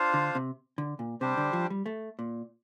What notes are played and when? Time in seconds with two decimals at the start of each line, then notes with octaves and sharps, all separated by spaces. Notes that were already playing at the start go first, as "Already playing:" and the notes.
Already playing: D4 F4 C5 F5
0.14 D3
0.35 C3
0.78 D3
0.99 A#2
1.21 C3 G3 D4 G4 C5
1.37 D3
1.53 F3
1.70 G3
1.86 A3
2.19 A#2